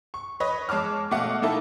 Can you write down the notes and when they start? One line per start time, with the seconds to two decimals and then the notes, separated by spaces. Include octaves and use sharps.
0.14 C#6
0.40 B4 C#5 D#5
0.69 G#3 C#5 A5 D6 F6
1.11 B2 A3 F5 F#5 D6
1.42 A3 A#3 D#4 E4 A4